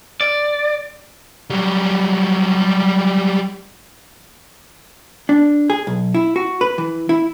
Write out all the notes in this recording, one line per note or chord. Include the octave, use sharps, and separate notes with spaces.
D5
F#3 G3
D4
G#4
B1
E4
F#4
B4
E3
E4